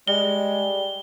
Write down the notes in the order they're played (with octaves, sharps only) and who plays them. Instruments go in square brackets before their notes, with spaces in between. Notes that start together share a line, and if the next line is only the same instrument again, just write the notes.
[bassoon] G3 [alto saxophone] G#3 [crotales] G7